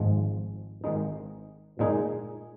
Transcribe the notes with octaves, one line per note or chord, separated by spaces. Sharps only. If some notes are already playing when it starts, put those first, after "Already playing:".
Already playing: G#1 G#2 F3 G#3
G#1 G#2 D#3 G#3 D#4
A#2 G#3 D#4 G#4